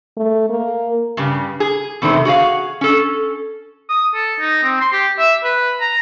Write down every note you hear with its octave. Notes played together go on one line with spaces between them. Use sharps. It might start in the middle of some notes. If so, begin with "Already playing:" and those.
A3
A#3
G2 C#3 G3
G#4
E2 C3 D#3 A3 C5
F#4 G#4 D#5 F5
C#4 A4
D#6
A4
D#4
C4
C6
G4
E5
B4
A#5